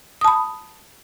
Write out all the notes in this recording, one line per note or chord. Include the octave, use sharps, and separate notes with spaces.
A5 B5 D#6